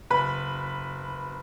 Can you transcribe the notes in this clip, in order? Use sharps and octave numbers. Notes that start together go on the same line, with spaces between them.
F#1 B4 B5